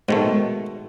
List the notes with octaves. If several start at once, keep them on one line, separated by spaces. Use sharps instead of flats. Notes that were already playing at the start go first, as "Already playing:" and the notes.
G#2 B2 D#3 A3